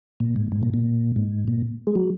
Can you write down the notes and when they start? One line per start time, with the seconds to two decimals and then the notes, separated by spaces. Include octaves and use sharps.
0.20 A#2
0.36 G#2
0.52 G#2
0.63 A#2
0.74 A#2
1.16 G#2
1.48 A#2
1.87 G#3
1.95 F#3